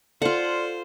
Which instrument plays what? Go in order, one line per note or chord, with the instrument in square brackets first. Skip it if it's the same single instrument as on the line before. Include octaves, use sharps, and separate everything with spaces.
[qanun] F4 F#5 [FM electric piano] A4 [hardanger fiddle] C5 [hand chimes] D5